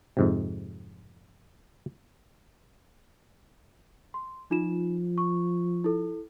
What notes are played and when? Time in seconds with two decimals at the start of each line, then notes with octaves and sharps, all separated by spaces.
0.17 F2 G#2 C3
4.14 C6
4.51 F3 D#4 F4 E7
5.18 C#6
5.84 E4 A4